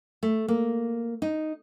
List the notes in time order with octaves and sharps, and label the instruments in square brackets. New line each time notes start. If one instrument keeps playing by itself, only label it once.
[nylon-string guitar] A3
A#3
D#4